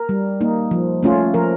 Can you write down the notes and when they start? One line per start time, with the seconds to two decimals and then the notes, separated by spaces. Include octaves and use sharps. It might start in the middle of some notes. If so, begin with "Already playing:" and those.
Already playing: A#4
0.09 G3
0.41 A#3 D#4
0.71 F3
1.03 A3 C#4 F4
1.34 F3 A#4